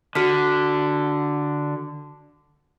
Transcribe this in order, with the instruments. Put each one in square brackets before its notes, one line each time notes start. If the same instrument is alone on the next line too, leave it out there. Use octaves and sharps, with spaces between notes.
[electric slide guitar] D3 [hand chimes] F#4 F6 B6